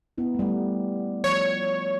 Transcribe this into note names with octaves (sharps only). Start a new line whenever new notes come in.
B3 D#4 E4
G3 A3
F3 C#5